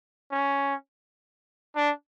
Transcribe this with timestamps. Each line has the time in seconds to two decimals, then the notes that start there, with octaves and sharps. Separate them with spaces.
0.31 C#4
1.76 D4